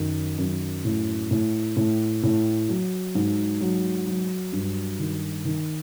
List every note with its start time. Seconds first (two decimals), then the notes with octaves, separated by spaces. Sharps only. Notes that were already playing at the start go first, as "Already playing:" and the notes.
Already playing: F#2 D#3
0.38 F#2
0.85 A2
1.31 A2
1.76 A2
2.23 A2
2.69 F#3
3.15 G#2
3.61 F#3
4.07 F#3
4.53 G2
4.99 D#3
5.45 D#3